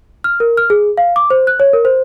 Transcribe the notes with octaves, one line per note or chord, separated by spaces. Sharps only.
F6
A#4
F6
G#4
F5
D6
C5
F#6
C#5
A#4
C5